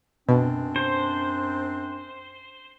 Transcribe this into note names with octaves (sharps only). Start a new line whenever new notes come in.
F#2 B2 C4 D4
C5